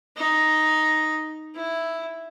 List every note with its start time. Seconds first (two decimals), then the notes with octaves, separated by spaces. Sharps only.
0.16 D#4
1.55 E4